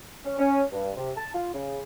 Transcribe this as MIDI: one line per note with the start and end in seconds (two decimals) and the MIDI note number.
0.25 0.35 61
0.38 0.62 61
0.72 0.90 43
0.96 1.10 48
1.16 1.31 81
1.33 1.50 65
1.54 1.80 49